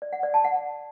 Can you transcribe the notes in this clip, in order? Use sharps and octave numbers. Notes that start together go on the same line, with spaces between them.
D5
F#5
D5
A5
F#5